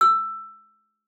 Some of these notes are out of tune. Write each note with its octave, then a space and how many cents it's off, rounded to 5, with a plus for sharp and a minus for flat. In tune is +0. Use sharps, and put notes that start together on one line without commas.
E6 +15